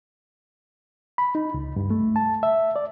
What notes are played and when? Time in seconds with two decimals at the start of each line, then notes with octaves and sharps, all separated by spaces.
1.18 B5
1.35 D#4
1.54 C#2
1.76 G2
1.90 A3
2.16 A5
2.43 E5
2.76 D5